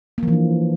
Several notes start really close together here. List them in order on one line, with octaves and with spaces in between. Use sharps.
A#3 F3 E3 D4